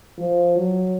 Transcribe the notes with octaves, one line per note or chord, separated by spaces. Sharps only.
F3
F#3